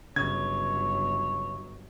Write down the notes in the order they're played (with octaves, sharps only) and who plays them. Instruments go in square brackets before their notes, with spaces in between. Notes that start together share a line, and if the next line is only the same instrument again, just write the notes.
[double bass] G1 F#3 [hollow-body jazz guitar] C#3 [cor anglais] C#5 [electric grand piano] G#6